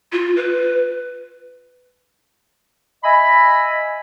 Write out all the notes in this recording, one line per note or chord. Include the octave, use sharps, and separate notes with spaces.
F4
B4
D#5 E5 G#5 B5